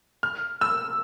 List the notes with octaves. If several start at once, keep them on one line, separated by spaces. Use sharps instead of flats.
F6
E6